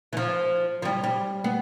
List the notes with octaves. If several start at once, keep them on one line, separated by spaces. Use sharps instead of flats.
E3
F3
F3
G3
G3
B3